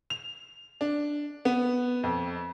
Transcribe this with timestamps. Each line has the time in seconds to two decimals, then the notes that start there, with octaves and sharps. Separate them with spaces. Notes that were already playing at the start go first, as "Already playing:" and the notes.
0.10 F7
0.81 D4
1.45 B3
2.03 F2